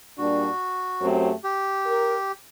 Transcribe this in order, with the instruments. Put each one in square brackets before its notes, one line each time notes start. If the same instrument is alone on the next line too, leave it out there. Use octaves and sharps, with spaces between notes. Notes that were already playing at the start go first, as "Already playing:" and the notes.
[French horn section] A#2 G3 D4 [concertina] F#4
[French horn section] F#2 F#3 A3 C4 G4
[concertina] G4
[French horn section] A#4